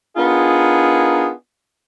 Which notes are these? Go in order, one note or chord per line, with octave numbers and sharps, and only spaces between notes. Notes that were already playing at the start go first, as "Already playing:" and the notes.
B3 D4 D#4 F4 G#4 A#4